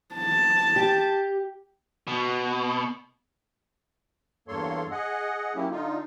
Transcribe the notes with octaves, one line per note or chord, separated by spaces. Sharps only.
A5
G4
B2
E2 G2 A#3 A4 C#5 C6
G#4 D#5 F#5
F#3 A#3 C#4 E4 G4
D3 D#4 F4